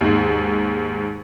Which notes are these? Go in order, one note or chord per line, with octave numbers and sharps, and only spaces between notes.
D#2 G#2